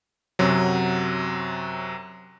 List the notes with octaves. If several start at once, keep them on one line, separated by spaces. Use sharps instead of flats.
F#2 C3 F#3